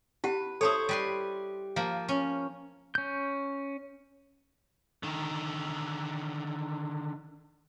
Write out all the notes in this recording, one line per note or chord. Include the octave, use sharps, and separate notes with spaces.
E4 G4 B4 F#5
E4 A4 C5 C#5 A5 D#6
G3 B4 C6
F3 A#3 F5
C#4
C#4 G6
D3 D#3